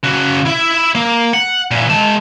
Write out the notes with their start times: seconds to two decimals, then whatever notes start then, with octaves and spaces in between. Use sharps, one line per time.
0.03 C#3 F#4
0.46 E4 E5
0.95 A#3
1.33 F#5
1.71 A#2 E3
1.90 G#3 A5